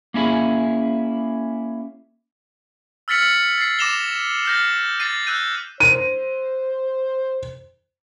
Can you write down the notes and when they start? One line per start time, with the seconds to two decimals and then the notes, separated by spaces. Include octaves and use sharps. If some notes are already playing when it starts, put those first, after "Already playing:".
0.14 A#3 C#4 E4 G#4
3.08 E6 F6 A6 B6 C#7 F#7
3.58 A6 C7
3.79 D6 A#6 E7 F7 G7
4.45 F6 G6 A#6
5.00 A6 C7 D#7
5.27 E6 F#6 G6 D#7
5.80 C5 D#7